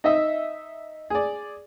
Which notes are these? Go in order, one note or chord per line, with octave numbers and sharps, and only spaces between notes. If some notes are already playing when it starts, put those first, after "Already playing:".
D#4 D#5 E5
G#4 D5